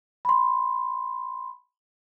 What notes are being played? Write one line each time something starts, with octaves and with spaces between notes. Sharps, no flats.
B5 C6